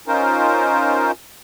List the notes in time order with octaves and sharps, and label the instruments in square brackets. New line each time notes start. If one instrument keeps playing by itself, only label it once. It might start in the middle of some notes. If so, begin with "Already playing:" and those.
[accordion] C#4 D#4 F4 A#4 C5